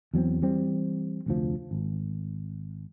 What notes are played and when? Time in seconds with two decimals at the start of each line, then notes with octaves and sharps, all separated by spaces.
0.14 E2 F#3 B3 C4
0.42 E3 G3 C4
1.26 F1 D2 F3
1.71 G#1